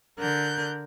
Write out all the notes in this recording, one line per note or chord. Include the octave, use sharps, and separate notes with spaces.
D3 A#4 F#6 G6